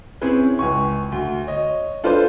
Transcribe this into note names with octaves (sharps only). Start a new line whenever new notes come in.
C4 C#4 E4 G#4 B4
C#2 G#5 C#6
D2
C#5 D#5
D4 F4 A4 B4 C5 D5